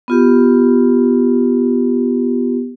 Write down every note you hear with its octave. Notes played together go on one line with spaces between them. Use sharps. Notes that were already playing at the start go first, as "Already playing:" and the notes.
B3 F4 G4